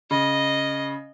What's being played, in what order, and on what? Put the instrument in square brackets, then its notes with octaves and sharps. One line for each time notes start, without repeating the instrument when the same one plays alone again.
[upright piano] C#3 [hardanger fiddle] D#5